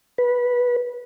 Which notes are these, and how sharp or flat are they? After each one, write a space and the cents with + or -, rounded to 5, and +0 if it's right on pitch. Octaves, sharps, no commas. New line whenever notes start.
B4 -15